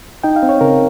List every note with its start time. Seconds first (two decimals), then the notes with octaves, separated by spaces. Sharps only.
0.24 D#4 G5
0.36 F5
0.43 C4
0.49 C#5
0.61 C#3 A#4